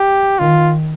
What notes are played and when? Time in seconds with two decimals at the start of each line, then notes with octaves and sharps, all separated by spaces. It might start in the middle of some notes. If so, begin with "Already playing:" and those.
Already playing: G4
0.39 D#3 F4